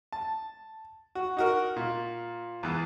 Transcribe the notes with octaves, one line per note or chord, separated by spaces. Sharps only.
A5
F#4
D#4 F#4 A#4
A#2
E2 E3